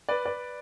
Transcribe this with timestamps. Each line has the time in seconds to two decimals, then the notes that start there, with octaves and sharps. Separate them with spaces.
0.09 B4 D5
0.25 B4 D5